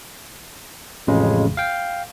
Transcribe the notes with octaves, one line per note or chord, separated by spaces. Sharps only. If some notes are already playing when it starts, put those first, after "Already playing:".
A1 F2 C#3 G#3
F5 G5